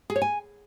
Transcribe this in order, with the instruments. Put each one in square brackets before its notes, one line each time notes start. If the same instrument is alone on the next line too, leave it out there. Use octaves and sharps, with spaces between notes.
[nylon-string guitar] G#4
C#5
G#5